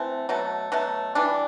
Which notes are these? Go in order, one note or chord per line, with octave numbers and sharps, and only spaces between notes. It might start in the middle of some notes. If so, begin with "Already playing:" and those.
Already playing: E3 A3 C4
B2 F#3 A3
B2 F#3 A3
E3 G3 D4